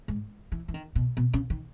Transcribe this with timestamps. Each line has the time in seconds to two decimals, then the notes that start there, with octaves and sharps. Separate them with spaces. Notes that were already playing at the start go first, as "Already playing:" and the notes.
0.08 G#2
0.52 E3
0.68 E3
0.74 D#3
0.95 B2
1.17 B2
1.34 C#3
1.50 D#3